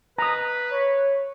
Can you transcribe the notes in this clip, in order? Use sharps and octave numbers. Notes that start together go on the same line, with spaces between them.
B4 A#5 D#6
C#5